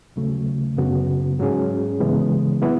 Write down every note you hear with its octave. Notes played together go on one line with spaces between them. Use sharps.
D#2 C#3 F#3 A3
F#2 C#3 F#3 B3 F#4
G#2 F#3 C#4 G#4
C#3 E3 G#3 B3
F#3 B3 E4